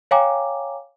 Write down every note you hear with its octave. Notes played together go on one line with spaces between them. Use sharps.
C#5 F5 G5 G#5 A#5 D6